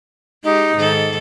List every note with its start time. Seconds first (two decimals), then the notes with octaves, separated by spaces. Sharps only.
0.44 G#3 D#4 G4
0.75 G#2 D#3 A4